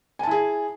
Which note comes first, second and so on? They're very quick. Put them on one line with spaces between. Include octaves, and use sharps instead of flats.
G#5 A5 E4 G#4